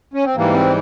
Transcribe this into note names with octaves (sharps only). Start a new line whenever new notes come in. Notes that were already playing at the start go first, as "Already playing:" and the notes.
C#4
C4
G#2 E3 G3 A#3
C4